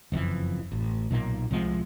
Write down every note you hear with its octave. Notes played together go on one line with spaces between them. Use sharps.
F#1 F2 B2 E3
A1
B1 A#2 A#3
C2 C3 F3 G#3